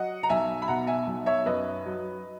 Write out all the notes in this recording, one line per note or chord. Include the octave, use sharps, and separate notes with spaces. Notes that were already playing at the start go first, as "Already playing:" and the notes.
Already playing: F#3 D#5 F#5
A#5
B1 E5 G#5
B5
B2 F#5 A#5
E5 G#5
B1
C#5 E5
F#2 B4 D#5
F#3